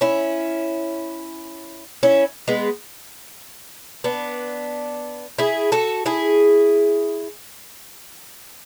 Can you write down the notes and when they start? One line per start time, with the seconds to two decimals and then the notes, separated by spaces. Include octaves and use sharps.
0.01 C#4 E4
2.03 C#4 E4
2.48 G#3 B3
4.04 B3 D4
5.38 E4 G#4
5.72 F#4 A4
6.06 E4 G#4